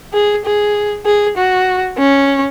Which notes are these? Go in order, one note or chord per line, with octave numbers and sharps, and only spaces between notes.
G#4
G#4
G#4
F#4
C#4